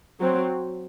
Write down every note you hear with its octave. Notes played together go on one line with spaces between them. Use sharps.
F#3 C4